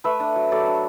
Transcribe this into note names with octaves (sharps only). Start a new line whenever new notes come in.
A3 B4 E5
D4
F#3
F#3 A4 D5
D4